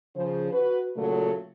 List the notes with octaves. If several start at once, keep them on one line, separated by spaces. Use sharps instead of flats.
C#3 F3 C5
F#4 B4
A#2 C#3 F#3 A3 F#4 A4